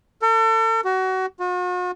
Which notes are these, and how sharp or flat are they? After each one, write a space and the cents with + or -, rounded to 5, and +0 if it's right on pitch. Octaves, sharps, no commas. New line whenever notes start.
A4 +40
F#4 +25
F#4 -45